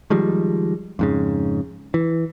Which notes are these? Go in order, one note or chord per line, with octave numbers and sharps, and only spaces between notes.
D#3 F3 G3 G#3
F2 G#2 C#3
E3